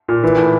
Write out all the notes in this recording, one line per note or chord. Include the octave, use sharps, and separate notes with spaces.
A#2
E3
A2